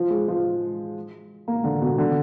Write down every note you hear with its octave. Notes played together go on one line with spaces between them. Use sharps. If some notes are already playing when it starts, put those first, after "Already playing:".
Already playing: F3
G#3
F3
A#3
D3
B2
D3